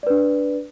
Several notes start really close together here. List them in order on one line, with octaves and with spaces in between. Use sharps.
D5 B4 D4